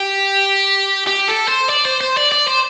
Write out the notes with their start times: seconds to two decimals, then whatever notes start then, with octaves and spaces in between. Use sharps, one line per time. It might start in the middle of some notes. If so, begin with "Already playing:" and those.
Already playing: G4
1.07 G4
1.28 A4
1.48 C5
1.69 D5
1.85 C5
2.01 C5
2.17 D5
2.32 D5
2.48 C5